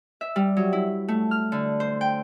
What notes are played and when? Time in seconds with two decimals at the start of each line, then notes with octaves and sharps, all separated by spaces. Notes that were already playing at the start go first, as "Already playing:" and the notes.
0.21 E5
0.36 G3
0.57 F#3
0.73 E4
1.08 A3
1.31 F6
1.52 D3
1.80 C5
2.01 G5